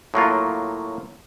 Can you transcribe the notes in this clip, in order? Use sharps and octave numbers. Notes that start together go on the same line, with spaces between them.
A2 F#3 A#3 F4